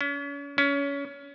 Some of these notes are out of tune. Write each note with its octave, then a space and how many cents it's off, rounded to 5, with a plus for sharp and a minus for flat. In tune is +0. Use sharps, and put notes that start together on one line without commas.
C#4 +40
C#4 +25